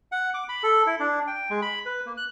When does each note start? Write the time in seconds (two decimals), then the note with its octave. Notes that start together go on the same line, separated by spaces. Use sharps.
0.12 F#5
0.34 D6
0.49 B5
0.63 A4
0.86 E4
0.99 D4
1.27 G5
1.50 G#3
1.62 B5
1.86 B4
2.06 A#3
2.17 F#6